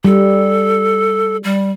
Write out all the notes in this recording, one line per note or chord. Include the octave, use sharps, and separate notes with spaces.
G3 A4
G3